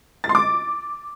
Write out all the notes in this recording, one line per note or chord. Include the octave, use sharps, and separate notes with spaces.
A6
C6
D6